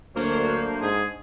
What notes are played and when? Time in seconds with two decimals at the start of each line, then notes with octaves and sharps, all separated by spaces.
0.16 D2 F#3 A3 A#3 D4 C5 C#5
0.82 G#2 G#4